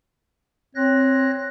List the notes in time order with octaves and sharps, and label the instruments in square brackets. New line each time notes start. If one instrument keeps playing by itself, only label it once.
[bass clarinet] C4 [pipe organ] C#5 F#6 A#6